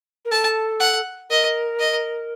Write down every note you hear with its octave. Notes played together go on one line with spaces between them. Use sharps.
A#4
A4 A5
F#5
A#4 D#5
D#5